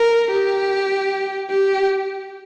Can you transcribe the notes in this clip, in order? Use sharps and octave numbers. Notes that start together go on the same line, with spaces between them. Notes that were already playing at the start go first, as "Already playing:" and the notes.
Already playing: A#4
G4
G4